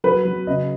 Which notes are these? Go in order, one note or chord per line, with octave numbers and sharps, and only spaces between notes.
F#3 B4
F#3
C#3 D#5